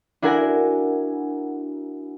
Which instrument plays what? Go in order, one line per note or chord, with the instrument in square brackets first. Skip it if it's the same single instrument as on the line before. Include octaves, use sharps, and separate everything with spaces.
[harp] D4 E4 F#4 A#4 G#5